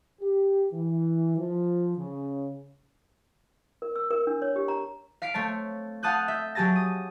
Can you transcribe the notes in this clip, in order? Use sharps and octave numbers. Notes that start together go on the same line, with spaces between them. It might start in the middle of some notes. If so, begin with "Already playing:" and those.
G4
E3
F3
C#3
A#4
E6
A#4
D4
C#5
G4
A#5
F5 B6 C7 D7
A3 C4 C#5 A5
F5 F#5 A5 D#6 F#6 G6
E5 G6
F#3 G4 G#4 A5 A6 A#6
D#6